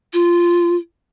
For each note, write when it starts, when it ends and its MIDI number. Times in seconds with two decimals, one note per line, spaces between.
0.14 0.76 65